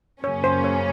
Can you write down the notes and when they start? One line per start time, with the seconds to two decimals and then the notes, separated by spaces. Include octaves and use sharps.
0.23 F#2 C#3 F#3 A#3 C#4 C#5
0.44 C5
0.64 C#5